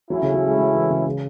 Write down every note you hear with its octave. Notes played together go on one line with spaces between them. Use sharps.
F#3 A3 C#4 E4
C#3
F#3
G#3
F#3
E3
C#3
C#3